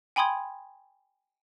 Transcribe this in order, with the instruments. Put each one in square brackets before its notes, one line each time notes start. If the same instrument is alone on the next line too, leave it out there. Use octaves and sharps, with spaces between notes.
[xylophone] G5 G#5 B5 C6 D#6 G#6